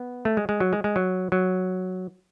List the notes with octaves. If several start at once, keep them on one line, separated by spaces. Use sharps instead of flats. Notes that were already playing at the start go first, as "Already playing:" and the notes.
Already playing: B3
A3
G#3
G#3
F#3
G#3
G#3
F#3
F#3